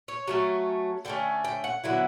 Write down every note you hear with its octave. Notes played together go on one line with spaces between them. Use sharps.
C#5
F#3 A3 C#4
D3 A3 C#4 G5
G5
F#5
D3 F#3 B3 E4